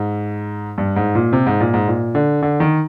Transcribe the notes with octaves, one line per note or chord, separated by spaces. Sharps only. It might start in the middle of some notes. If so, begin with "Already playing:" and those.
Already playing: G#2
G2
G#2
A#2
C3
G#2
A#2
G#2
A#2
D3
D3
D#3